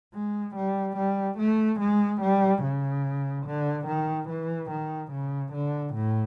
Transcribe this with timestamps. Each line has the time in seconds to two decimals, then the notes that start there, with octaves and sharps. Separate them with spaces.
0.14 G#3
0.56 G3
0.97 G3
1.38 A3
1.80 G#3
2.21 G3
2.63 C#3
3.46 D3
3.87 D#3
4.29 E3
4.70 D#3
5.12 C#3
5.53 D3
5.94 A2